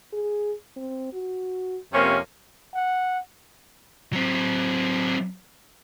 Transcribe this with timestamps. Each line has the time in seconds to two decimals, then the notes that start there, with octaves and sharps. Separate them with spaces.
0.13 G#4
0.76 C4
1.13 F#4
1.93 F2 C3 A#3 C#4
2.75 F#5
4.13 F#3 C4